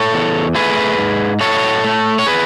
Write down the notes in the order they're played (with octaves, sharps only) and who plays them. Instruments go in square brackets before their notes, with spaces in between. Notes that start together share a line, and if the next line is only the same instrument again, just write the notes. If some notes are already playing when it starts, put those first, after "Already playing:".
Already playing: [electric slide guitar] A4 C#5
E2
A3 G#4 B4
G#2
F#3 A4 C#5
A3
C#5
G#4 B4